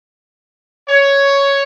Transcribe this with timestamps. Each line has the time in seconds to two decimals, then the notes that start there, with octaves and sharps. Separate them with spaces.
0.88 C#5